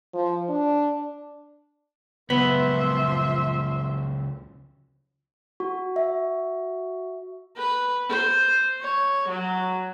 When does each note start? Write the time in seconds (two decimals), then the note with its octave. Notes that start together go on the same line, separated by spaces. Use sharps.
0.14 F3
0.49 D4
2.30 C#2 F3 F#3 B3 E5 C6
5.60 F#4
5.96 E5
7.57 B4
8.09 C5
8.81 C#5
9.29 F#3